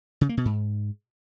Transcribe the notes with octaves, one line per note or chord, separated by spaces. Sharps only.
C#3
A#3
B2
G#2